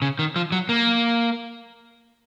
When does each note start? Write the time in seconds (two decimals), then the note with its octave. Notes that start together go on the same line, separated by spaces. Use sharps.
0.02 C#3
0.19 D#3
0.36 F3
0.52 F#3
0.69 A#3